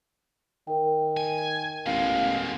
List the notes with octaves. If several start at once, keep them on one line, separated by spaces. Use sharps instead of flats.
D#3 A#4 G5
G#5
A1 B2 G#3 F5